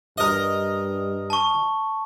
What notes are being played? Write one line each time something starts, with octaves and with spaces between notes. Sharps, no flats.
G2 A#4 D#5
A5 C#6